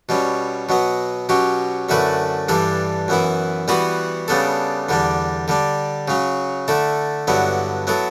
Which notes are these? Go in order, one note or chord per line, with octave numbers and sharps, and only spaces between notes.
B2 G3 C#4
B2 F#3 B3
B2 F#3 C#4 G4
F#2 D3 A3 E4 B4
G2 E3 G3 D4 A4
F#2 E3 B3 E4
E3 G3 B3 F#4 B4
C#3 G3 B3 D4 A4
E2 D3 G3 D4
D3 G3 D4
C#3 F#3 C#4
D3 A3 E4 A4
G2 D3 F#3 B3 E4
F#3 B3 E4 A4